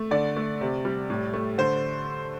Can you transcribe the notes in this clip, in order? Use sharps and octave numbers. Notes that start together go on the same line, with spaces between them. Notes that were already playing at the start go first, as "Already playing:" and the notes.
Already playing: A3
D3 D5
A3
C3
G3
A2
A3
D3 C5